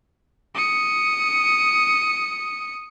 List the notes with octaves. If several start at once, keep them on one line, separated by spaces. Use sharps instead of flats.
D#6 C#7